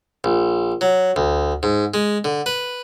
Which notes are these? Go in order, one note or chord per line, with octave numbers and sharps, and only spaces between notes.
A#1
F#3
D2
G#2
G#3
D3
B4